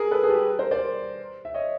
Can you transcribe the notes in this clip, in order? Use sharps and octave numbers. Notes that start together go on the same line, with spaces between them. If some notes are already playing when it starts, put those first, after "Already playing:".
Already playing: G#4 A#4
A4 B4
G#4
G4 A4
A#4 C5
C5 D5
E5
C#5 D#5